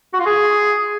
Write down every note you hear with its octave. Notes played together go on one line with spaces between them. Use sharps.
F#4
F4
G#4